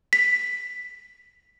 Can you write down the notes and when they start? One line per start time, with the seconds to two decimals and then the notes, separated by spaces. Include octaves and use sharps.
0.13 B6